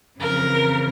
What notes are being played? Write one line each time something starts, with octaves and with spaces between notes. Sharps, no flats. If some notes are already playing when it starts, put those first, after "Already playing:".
F2 C#3 E3 A#4